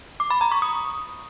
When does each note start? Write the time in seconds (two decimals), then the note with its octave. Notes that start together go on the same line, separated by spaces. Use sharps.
0.20 D6
0.30 B5
0.41 A#5
0.52 C#6
0.62 D#6